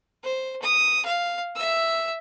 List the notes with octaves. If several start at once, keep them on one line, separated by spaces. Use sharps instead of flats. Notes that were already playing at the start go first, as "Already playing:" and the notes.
C5
D#6
F5
E5 E6